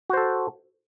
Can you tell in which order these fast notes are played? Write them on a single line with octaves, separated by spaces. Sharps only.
F#4 C5 A4